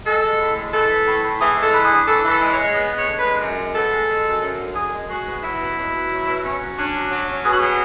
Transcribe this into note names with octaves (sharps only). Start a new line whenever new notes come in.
G#3 A4
G#3
A2
G#3
E3 A4
E3
A2
A2
E3 G#4
G#3
A4
E3
G#4
D4
E3 A4
E3
A4
G#3
C#5
G#3
B3
G#3
C#5
D3
B4
G#3
F#2
G#3
B3 A4
G#3
G#3
F#2
F#2
D3
F#2 G#4
G#3
G#3 F#4
B3
F#3 E4
B2
B2
B2
F#3
B2
C#4
F#3
C#4 D4
F#3
F#3
C#4
B2 G#4
F#4
F#3 G#4